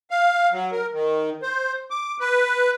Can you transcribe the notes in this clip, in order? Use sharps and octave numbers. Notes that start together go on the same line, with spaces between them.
F5
F#3
A#4
D#3
C5
D6
B4